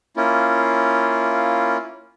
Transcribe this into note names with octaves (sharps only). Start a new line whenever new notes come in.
A#3 C#4 E4 F4